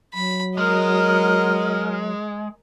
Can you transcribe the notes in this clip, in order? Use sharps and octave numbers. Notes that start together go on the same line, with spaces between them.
F#3 B5
G#3 A#4 D#5 F#5 F6